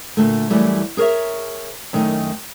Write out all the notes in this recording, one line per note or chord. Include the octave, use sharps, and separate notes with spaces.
A#2 D3 A3
F#2 E3 F#3 G3 A3 E4
G#4 A#4 B4 C#5 E5
F#2 D#3 A3 D#4